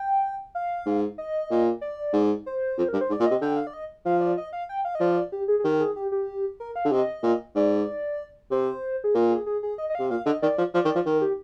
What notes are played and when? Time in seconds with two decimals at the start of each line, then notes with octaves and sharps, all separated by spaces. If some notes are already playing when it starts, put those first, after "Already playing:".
Already playing: G5
0.55 F5
0.86 G#2
1.18 D#5
1.51 A#2
1.81 D5
2.13 G#2
2.46 C5
2.78 F2
2.89 G2 A#4
3.01 C5
3.09 G#2
3.13 D5
3.20 A#2
3.26 C3 D#5
3.41 D3 G5
3.57 F5
3.67 D5
3.73 D#5
4.05 F3 F5
4.21 D5
4.37 D#5
4.53 F5
4.69 G5
4.85 F5
4.95 D#5
5.00 F3 D5
5.32 G4
5.48 G#4
5.59 G#4
5.64 D#3 G4
5.80 G#4
5.96 G4
6.12 G4
6.60 A#4
6.76 F5
6.85 D3
6.92 C3 D#5
7.23 A#2
7.55 G#2 D5
8.51 C3 C5
9.04 G#4
9.15 A#2 A#4
9.31 G#4
9.46 G#4
9.63 G#4
9.78 D#5
9.90 D#5
9.95 C3 F5
10.11 A#2 F5
10.26 D3 D#5
10.42 D#3 D5
10.58 F3
10.74 F3 D5
10.85 D#3
10.90 F3 D5
11.06 D#3 A#4
11.21 G4